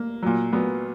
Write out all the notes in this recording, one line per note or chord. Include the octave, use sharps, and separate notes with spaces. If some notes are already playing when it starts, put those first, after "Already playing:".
Already playing: A#3
A#2 F#3
A#2 F#3 B3